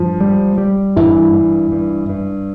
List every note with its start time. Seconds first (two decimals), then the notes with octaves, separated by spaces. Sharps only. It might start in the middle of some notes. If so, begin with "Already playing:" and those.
Already playing: G2 F3
0.21 G3
0.58 G3
0.96 G2 E3
1.34 G2
1.72 G2
2.09 G2